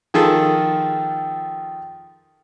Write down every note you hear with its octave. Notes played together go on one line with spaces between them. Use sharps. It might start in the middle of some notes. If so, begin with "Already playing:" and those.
D#3 F3 F4 G#4 A4